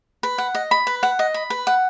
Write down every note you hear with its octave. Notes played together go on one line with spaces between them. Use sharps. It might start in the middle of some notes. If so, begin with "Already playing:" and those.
B4
F#5
D#5
B5
B4
F#5
D#5
B5
B4
F#5